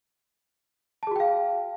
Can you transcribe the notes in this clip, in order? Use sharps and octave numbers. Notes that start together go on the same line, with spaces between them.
F#4 G#4 F5 G5 A5